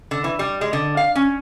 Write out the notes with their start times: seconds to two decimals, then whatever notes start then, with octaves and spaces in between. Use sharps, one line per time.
0.11 D3
0.24 E3
0.39 G3
0.61 G#3
0.73 D3
0.97 F5
1.15 C#4